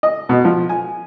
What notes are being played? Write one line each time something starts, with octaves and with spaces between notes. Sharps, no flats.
D#5
B2
F3
G#5